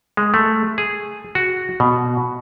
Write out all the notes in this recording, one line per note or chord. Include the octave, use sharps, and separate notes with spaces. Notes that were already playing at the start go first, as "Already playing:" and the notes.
G#3
A3
G#4
F#4
B2